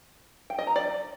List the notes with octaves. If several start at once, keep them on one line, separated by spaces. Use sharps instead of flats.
G5
D#5
A#5
D5